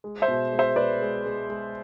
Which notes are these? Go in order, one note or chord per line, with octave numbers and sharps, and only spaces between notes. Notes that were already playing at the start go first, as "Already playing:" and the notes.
G#3
C5 E5
B2
G#3
C5 E5
G#3 B4 D5
G#3
G#3
G#3